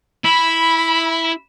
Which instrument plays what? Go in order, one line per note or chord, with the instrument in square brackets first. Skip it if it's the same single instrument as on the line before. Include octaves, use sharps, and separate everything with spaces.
[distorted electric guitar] E4 [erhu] B5